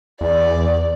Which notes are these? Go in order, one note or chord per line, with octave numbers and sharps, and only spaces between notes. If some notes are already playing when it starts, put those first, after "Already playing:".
E2 D5